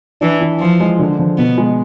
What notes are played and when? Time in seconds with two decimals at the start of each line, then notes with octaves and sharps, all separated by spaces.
0.21 E3 D4
0.41 E3
0.60 F3 F4
0.80 G#3
0.99 D3
1.19 F3
1.38 B2 B3
1.58 G#3